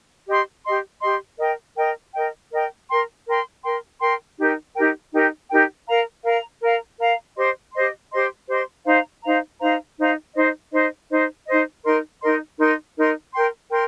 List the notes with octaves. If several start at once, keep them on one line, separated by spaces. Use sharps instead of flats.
G4 D#5 C6
G4 D#5 C6
G4 D#5 C6
A#4 D#5 G5
A#4 D#5 G5
A#4 D#5 G5
A#4 D#5 G5
A#4 G5 C6
A#4 G5 C6
A#4 G5 C6
A#4 G5 C6
D#4 G4 A#4 G5
D#4 G4 A#4 G5
D#4 G4 A#4 G5
D#4 G4 A#4 G5
A#4 F5 A#5
A#4 F5 A#5
A#4 F5 A#5
A#4 F5 A#5
G4 C5 D#5 C6
G4 C5 D#5 C6
G4 C5 D#5 C6
G4 C5 D#5 C6
D#4 C5 F5 A#5
D#4 C5 F5 A#5
D#4 C5 F5 A#5
D#4 C5 F5 A#5
D#4 C5 D#5
D#4 C5 D#5
D#4 C5 D#5
D#4 C5 D#5
D#4 A#4 D#5 C6
D#4 A#4 D#5 C6
D#4 A#4 D#5 C6
D#4 A#4 D#5 C6
A#4 G5 C6
A#4 G5 C6